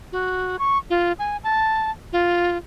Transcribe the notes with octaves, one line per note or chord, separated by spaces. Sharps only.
F#4
C#6
F4
G#5
A5
F4